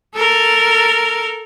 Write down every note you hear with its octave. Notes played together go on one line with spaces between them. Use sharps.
A4 A#4